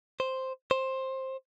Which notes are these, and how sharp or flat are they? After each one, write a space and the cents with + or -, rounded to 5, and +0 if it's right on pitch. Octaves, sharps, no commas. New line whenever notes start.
C5 +0
C5 +15